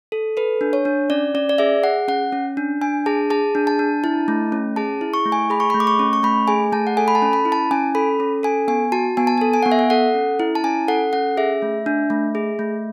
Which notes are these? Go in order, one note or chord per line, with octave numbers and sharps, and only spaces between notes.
A4
A4 B4
D4
C#5
D4
C#4 D5
C#4 D5
D5
G#4 E5
G#4 F#5
C#4 F#5
C#4
D4
D4 G#5
G#4 A5
G#4 A5
D4
A5
D4
E4 A5
A3
C#4
G#4 A5
E4
C#6
A3
G#5
G#4 B5
C#6
A3 B5
D6
C#6
C#4
C#6
A3 B5
G#4 G#5
A3 A5
F#5
A4 G#5
B5
A5
C#4
B5
E4
A5
C#4 G#5
A4 B5
C#4
A4 G#5
B3 G#5
F#4 A5
B3 G#5
A5
A4 G#5
G#5
B3 F#5
E5
F#5
A4 F#5
C#4
E4
A5
C#4 G#5
A4 F#5
C#4 F#5
G#4 E5
A3
D4
A3
G#4
A3